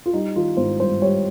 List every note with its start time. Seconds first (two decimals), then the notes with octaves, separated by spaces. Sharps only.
0.06 F4
0.13 G3 D#4
0.36 D#3 F4
0.57 G#1 C5
0.80 G2 C5
1.02 G3 C#5